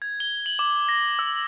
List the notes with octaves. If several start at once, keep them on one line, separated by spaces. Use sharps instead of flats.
G#6
G7
F#7
D6
A#6
E6